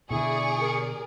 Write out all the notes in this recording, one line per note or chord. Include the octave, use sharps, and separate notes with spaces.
B2 D3 E4 G#4 D5 C#6
A#4